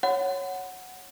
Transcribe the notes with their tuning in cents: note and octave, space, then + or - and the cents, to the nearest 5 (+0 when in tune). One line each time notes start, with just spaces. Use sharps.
C#5 +0 F#5 +0 B5 +40